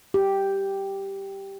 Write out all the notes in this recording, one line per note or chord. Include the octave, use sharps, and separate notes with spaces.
G4